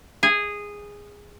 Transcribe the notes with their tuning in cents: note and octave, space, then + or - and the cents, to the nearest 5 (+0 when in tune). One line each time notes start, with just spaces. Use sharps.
G#4 -10